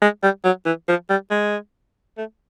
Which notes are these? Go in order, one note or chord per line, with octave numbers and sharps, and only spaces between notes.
G#3
G3
F#3
E3
F3
G3
G#3
A3